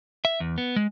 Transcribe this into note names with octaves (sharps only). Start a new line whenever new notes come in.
E5
E2
B3
G#3